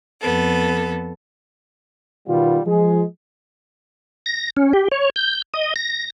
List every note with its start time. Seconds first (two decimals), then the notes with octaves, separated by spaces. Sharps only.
0.21 F2 B3 A4
2.27 B2 D#3 G3 B3 F4
2.66 F3 G#3 G#4
4.26 A#6
4.57 C#4
4.73 G4
4.92 C#5
5.16 G6
5.54 D#5
5.76 A#6